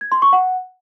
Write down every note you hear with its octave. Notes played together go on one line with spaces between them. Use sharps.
G#6
C6
C#6
F#5